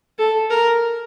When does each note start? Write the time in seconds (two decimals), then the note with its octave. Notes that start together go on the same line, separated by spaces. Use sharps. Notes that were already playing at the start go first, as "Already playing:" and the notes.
0.19 A4
0.50 A#4